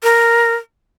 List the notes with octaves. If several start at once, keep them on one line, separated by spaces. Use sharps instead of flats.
A#4